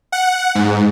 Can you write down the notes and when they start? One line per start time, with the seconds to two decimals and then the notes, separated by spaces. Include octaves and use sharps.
0.12 F#5
0.55 G#2